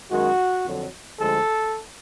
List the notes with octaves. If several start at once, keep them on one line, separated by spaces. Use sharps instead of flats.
F#2 D#3 G#3 F#4
F2 D3 F#3
D2 D3 F3 G#3 A4